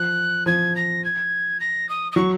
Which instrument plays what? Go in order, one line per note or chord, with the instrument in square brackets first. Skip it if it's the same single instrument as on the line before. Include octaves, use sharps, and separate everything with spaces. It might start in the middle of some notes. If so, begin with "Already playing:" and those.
Already playing: [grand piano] F3 [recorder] F#6
[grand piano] F3 [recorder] G#6
[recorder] A#6
G#6
A#6
D#6
D#6
[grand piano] F#3 [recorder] C#6